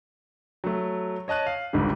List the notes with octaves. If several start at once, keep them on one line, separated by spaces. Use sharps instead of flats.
F#3 A3
C#5 D#5 A5 F#6 D#7
F5
G#1 C#2 G#2 D3 G3